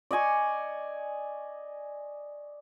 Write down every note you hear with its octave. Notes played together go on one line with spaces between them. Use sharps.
D5 D#5 G#5 C#6